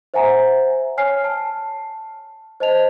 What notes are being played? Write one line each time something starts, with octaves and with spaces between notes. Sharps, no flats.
C5 E5 F#5 G#5 A#5
C#5 G#5 F6 C7
A5
C5 D#5 A5 F7